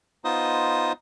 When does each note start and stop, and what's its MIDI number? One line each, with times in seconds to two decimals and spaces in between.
0.25 0.92 59
0.25 0.92 63
0.25 0.92 65
0.25 0.92 72
0.25 0.92 75
0.25 0.92 87